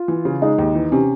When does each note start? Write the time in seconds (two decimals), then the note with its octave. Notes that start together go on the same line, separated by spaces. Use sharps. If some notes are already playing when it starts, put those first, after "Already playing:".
Already playing: F4
0.08 E3
0.25 C#3
0.42 G#3 D#4
0.58 D#2
0.75 E3
0.92 C3 C#4